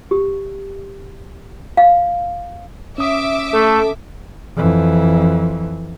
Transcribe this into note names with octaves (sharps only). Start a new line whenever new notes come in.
G4
F5
C#4 E5 D6 D#6
A3 A4
F2 E3